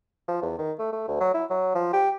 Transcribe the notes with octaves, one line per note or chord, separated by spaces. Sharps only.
F3
E2
D#3
A3
A3
D2
F#3
E4
F#3
F3
G4